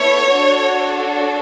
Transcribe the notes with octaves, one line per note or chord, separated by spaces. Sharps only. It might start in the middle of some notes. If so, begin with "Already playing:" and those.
Already playing: B3 E4 A4 C#5
D4 F#4 A4